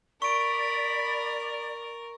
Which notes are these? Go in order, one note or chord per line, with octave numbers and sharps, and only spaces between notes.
A#4 D5 B5 C#6 D7